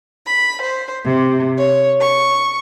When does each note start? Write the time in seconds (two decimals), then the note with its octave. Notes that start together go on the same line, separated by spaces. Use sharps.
0.25 B5
0.60 C5
1.04 C3
1.57 C#5
1.99 C#6